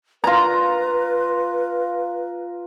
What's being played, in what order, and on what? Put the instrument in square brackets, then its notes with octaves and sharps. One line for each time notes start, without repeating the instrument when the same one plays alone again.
[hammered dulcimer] F4 A#5 [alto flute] B4